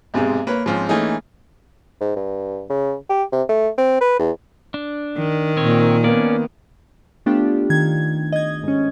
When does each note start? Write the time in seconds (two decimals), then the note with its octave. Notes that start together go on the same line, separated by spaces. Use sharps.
0.14 B1 G#2 C3 G#3
0.47 A#3 B4 C#5
0.66 G#2 F3 C4 C#4
0.89 E3 A3 A#3 C#4 D#4 G#4
2.01 G#2
2.16 G2
2.70 C#3
3.10 G4
3.32 C3
3.49 A3
3.78 C4
4.01 B4
4.19 E2
4.74 D4
5.17 D#3
5.57 A#2 C4 C#5
6.04 A#3 B3 C#4 D5
7.26 A3 B3 D4 F4 G4
7.70 D#3 G#6
8.32 D#5 G#6
8.63 G#2 C#4